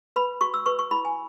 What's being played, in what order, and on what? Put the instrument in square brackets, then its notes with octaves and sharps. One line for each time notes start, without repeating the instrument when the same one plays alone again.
[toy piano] B4 B5
F#4 C#6
E6
B4 C#6
C#6
E4 B5
G#5